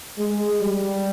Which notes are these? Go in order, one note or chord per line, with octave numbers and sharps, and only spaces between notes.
G#3
G3